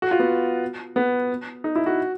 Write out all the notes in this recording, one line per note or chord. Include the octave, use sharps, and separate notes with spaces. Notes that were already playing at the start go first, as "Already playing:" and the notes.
F#4
F4
B3
B3
D#4
E4
F#4